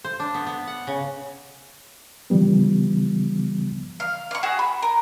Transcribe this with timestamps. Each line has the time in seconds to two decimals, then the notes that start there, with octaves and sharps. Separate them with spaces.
0.04 C5
0.20 D4
0.34 B3
0.47 B3
0.67 F#5
0.87 C#3
2.30 C#3 E3 F3 G3 B3
4.00 F5
4.31 F5 C#6
4.43 F#4 G#4
4.59 B5
4.82 A#4